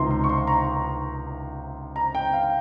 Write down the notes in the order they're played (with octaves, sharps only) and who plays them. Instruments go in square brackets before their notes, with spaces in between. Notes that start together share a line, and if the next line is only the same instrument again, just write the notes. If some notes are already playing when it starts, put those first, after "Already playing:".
Already playing: [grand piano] C#2 C3 D#3 A#5 C6
C6
C#6
C6
A#5
A#5
G5
F5